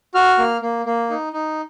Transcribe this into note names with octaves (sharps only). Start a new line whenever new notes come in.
F#4 F6
A#3
A#3
A#3
D#4
D#4